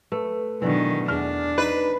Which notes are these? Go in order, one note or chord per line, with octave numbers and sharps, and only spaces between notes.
A3 B4
B2 D#3 E3 F#3 D4
E2 D4 F6
D#4 B4